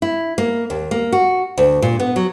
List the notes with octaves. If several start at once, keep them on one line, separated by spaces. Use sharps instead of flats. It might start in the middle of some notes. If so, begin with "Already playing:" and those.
E4
A#3
D#2
A#3
F#4
D2
A#2
B3
F#3